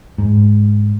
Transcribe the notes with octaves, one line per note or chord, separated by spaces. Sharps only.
G#2